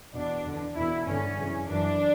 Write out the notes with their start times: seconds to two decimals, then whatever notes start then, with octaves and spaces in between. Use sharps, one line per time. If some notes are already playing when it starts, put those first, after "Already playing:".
0.13 E2 B2 D4
0.44 E2 D3
0.75 E2 B2 E4
1.06 G2 D3 C#4
1.38 F#2 C#3 E3
1.68 F#2 E3 D4